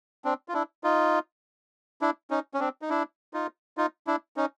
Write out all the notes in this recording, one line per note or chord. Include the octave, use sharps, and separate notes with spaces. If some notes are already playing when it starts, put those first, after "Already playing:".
C4 D4
F4
D4 E4
D#4 F4
D4 E4
C#4 D#4
C#4
C4 D4
D#4
D4 E4
D#4 F4
D#4 F4
D4 E4
C#4 D#4